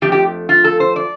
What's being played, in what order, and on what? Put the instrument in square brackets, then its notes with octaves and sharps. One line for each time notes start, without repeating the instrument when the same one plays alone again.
[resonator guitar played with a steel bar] F2 F3 A3 G4
G4
F4
A4
C5
D5